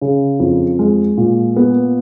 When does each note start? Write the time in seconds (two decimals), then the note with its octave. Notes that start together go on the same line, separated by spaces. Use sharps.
0.01 C#3
0.40 F2
0.79 G#3
1.17 A#2
1.56 B3